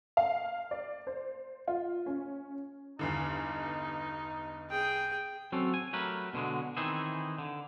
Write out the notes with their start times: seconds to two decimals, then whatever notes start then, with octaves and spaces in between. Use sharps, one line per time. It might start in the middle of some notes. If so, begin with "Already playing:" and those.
0.17 F5
0.71 D5
1.07 C5
1.68 F4
2.06 C#4
2.99 E2 G2 D3 D#4
4.70 G#4 G5
5.52 F#3 C4 C#4 A4
5.74 G#5
5.93 F#3 G3 A3 A#4 B4
6.33 B2 D3 F#3 G#3
6.76 D#3 E3 C4 D#4 G#4 A4
7.38 D3